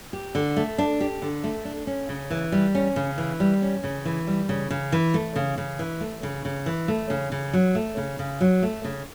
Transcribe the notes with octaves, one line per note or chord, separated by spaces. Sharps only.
G4
D3
A3
D4
G4
D3
A3
D4
C#4
C#3
E3
G3
C#4
C#3
E3
G3
C#4
C#3
E3
G3
C#3
C#3
E3
A3
C#3
C#3
E3
A3
C#3
C#3
E3
A3
C#3
C#3
F#3
A3
C#3
C#3
F#3
A3
C#3